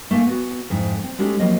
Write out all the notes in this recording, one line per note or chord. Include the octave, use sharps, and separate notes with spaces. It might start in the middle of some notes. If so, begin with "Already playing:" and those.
A3 A#3 E5 G#5
B3 F#4
F2 G#2 E4
C4
G#3 A3 C#4 D#4 G4 A4
F3 F#3 A#3 C4 C#5 D#5